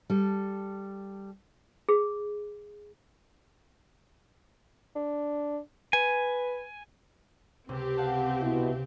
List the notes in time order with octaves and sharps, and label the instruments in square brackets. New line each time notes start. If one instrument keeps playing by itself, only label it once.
[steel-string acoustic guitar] G3 A4
[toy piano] G#4
[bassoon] D4
[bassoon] B4 [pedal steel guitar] G#5
[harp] C#2 C3 [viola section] C4 G4
[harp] F5 F#5 A5
[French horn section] B2 E4